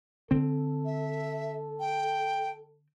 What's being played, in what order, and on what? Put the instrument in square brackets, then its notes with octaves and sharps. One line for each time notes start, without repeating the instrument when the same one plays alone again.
[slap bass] D3 C4 [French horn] A4
[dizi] E5
G5